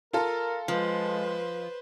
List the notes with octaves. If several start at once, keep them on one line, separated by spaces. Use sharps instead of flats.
F4 A4 A#4
F3 G#3 B4 C5